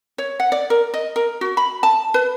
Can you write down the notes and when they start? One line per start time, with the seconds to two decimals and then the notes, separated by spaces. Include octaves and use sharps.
0.18 C#5
0.40 F#5
0.52 D5
0.70 A#4
0.94 D#5
1.16 A#4
1.41 F#4
1.57 B5
1.83 A5
2.14 B4